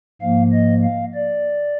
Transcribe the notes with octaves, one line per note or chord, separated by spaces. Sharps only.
G#2 F3 A#3 F5
D#5
F5
D5